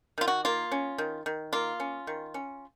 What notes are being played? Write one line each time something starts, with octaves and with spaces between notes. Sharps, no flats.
D#3 F4
F#4
A#3 F4
C#4
D#3
D#3
A#3 F4
C#4
D#3
C#4